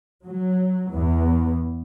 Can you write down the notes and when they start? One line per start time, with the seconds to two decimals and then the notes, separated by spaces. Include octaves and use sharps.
0.24 F#3
0.92 E2